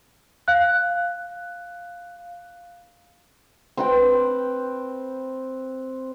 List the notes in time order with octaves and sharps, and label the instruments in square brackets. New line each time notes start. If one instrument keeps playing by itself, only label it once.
[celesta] F5 F#6
[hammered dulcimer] C4 B4 G5